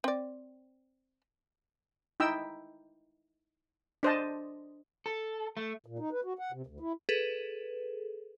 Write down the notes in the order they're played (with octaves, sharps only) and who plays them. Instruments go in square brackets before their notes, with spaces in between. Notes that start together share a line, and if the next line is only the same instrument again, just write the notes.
[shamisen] C4 D5
[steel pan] D#4 E4 G5 E6
D4 C5 D#5 A5
[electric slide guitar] A4
A3
[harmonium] A#2
D#4
B4
F#4
F#5
C3
D2
E4
[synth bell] G#4 A4 B4